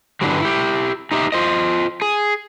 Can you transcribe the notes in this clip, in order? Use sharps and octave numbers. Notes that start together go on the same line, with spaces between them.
G2 D3 E3 F#3 G3
E4 G4
D#4 G4 E5
F4 C5 D#5
G#4